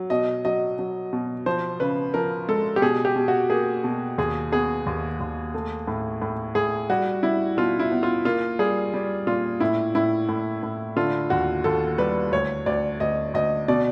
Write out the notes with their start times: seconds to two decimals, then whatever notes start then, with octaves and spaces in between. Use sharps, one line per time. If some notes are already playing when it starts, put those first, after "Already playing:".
Already playing: F#3
0.10 B2 D#5
0.45 F#3 D#5
0.79 F#3
1.13 B2
1.46 F3 C5
1.80 C#3 B4
2.14 F3 A#4
2.48 G#3 A4
2.76 G4
2.82 B2 G#4
3.05 G4
3.16 B2
3.28 F#4
3.50 A#3 G#4
3.84 B2
4.18 D#2 G#4
4.52 B3 G#4
4.86 D#2
5.20 D#2
5.54 A3
5.87 A2
6.22 A2
6.55 A2 G#4
6.90 G3 F#4
7.23 G3 E4
7.57 B2 F4
7.79 E4
7.92 B3
8.03 F4
8.25 A#3 F4
8.59 G3 G#4
8.93 G3
9.27 A#2 F4
9.60 A2 E4
9.95 A2 E4
10.29 A2
10.63 A2
10.96 D3 F4
11.30 D#2 F#4
11.64 D#2 A4
11.98 G3 B4
12.32 D2 C#5
12.66 D2 D5
13.00 D2 D#5
13.34 D2 D#5
13.68 B2 D5